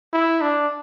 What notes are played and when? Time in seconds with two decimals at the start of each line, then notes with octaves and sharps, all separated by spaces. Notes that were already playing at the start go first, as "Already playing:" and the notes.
0.13 E4
0.41 D4